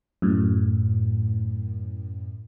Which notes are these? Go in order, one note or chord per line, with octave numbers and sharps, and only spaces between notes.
F#2 A2